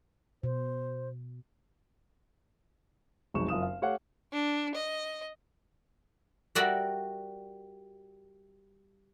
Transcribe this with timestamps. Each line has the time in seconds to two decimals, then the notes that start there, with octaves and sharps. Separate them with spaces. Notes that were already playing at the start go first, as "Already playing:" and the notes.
0.43 B2 C5
3.34 F1 B1 G#3 D#4 C#6 E7
3.48 F#1 F4 D#6 E7
3.62 F5
3.82 A3 G4 C#5 F5 F#5
4.33 D4
4.75 D#5
6.55 G3 F#4 A#4 D5 E5 F#5